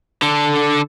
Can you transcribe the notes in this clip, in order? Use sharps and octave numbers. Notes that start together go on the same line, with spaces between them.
D3 A4